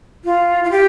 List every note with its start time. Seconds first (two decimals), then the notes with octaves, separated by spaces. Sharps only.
0.25 F4
0.64 F4
0.71 G4